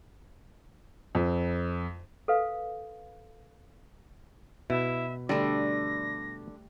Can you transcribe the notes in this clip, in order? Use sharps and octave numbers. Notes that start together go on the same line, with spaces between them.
F2
A4 B4 F5
B2 E4 E5
D3 G3 A3 D4 A#6